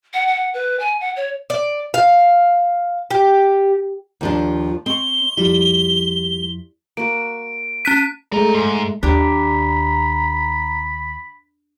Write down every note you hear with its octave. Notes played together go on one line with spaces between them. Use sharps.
F#5
F#5
B4
G#5
F#5
C#5
D5
F5
G4
D#2 F3 D4
C4 D#5 C6 C#6 G7
F2 F3 G3 E4
A#3 F#4 D7
C#4 F#6 B6 D#7
G#3 A3 D5 A#5
G#2
D#2 D4 G4 A#5 B5